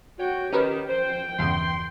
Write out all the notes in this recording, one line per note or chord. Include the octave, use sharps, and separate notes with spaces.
F#4 C#5 G5
D#3 C#4 G4 A#4 B4
C5 G5
E2 G2 C#3 C6